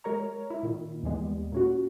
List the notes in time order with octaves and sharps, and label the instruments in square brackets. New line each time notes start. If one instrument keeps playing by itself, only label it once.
[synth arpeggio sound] G#3 A#4 C#5 A#5
E4
A#2 D#3
D#2 E3 G3 G#3 B3
A#2 C#4 F#4